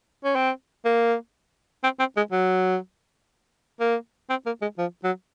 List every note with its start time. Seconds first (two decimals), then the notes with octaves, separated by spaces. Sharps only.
0.24 C#4
0.35 C4
0.85 A#3
1.83 C4
1.99 C4
2.17 G#3
2.32 F#3
3.80 A#3
4.30 C4
4.46 A#3
4.62 G#3
4.78 F3
5.04 F#3